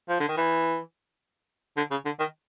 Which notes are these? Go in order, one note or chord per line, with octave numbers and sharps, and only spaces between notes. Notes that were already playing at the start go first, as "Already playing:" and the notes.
F3
D3
D#3
E3
D3
C#3
D3
D#3